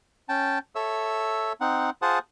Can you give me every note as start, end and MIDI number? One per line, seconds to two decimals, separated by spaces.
0.29 0.59 61
0.29 0.59 79
0.29 0.59 81
0.75 1.53 69
0.75 1.53 73
0.75 1.53 76
0.75 1.53 88
1.61 1.90 60
1.61 1.90 63
1.61 1.90 78
2.02 2.19 65
2.02 2.19 68
2.02 2.19 72
2.02 2.19 78
2.02 2.19 81
2.02 2.19 87